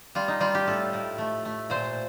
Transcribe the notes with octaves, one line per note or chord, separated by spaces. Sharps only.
G3 F4
D#4
G3 F4
G4
A2 A4
A2
A3
A3
A#2 C5